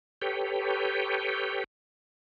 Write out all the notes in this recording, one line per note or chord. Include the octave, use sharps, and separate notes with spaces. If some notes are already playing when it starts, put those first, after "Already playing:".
G4 A4 B4 C#5 G5